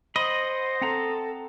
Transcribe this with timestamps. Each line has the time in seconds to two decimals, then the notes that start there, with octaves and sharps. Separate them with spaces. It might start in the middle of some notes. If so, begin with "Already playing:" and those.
0.16 C5 D#5 F#5 B5
0.81 C4 A4 F#5 A#5